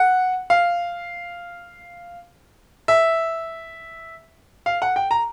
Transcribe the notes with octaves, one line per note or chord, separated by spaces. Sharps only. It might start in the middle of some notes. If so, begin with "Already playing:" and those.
Already playing: F#5
F5
E5
F5
F#5
G5
A#5